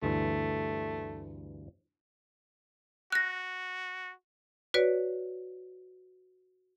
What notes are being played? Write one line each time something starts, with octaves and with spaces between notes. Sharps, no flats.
D2 G2 E3 A3
F#4 F#6 A#6
F#4 B4 C#5 D5